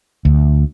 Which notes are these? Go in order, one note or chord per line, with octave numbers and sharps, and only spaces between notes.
D2